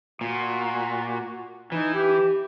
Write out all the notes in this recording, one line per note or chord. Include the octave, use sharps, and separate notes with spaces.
A#2 F#4
E3 D#4
G4